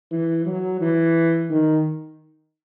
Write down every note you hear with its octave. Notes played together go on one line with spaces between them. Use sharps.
E3
F#3
E3
D#3